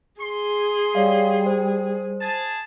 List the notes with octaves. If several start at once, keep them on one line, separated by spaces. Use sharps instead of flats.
G#4 C6
G3 C#5 D5 F5
C5
G#4 A5